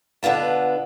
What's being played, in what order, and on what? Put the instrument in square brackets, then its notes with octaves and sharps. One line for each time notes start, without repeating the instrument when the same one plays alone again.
[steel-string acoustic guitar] B2 D3 B3 F4 A5